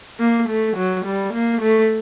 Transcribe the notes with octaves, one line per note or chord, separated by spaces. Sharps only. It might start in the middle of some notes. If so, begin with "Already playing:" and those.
A#3
A3
F#3
G3
A#3
A3